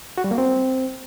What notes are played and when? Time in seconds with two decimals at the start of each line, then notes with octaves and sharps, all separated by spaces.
0.18 F#4
0.24 G3
0.31 A#3
0.38 C4